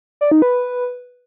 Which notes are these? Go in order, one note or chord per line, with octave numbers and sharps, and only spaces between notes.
D5
D#4
B4